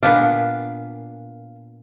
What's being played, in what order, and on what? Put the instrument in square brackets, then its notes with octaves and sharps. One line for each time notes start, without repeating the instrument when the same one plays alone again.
[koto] A#2 B3 D4 [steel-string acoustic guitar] F5